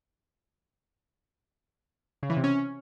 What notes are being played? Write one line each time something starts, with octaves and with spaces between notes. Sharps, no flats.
C#3
E3
C3
C#4